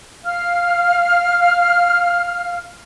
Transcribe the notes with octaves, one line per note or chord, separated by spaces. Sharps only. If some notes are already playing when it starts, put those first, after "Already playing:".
F5 F6